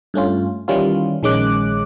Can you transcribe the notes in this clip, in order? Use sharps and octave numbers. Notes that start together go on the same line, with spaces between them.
G2 A3 C#4 F4
D#3 E3 G3 C#4 E4 F4
A#1 D#3 G#3 C#4 D6 F#6